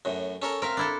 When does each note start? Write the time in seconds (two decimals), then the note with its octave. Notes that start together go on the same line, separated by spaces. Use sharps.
0.05 F#2 A2
0.42 C#4 A4 A#4
0.62 C4 A#4 E5 F5
0.77 D4 E4 A4